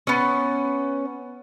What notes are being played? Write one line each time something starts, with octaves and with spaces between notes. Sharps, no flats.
B3 C#4